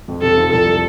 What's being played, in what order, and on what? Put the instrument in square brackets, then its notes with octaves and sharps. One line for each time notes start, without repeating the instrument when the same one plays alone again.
[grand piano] F2
[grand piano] C3 [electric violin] A4
[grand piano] F3
[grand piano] C2 [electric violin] A4